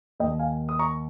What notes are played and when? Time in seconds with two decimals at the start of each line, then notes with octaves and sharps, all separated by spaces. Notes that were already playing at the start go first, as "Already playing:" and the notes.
0.19 D#2 D#5 G5
0.24 D#3
0.39 F5 G#5
0.69 D#6
0.79 A#5 C#6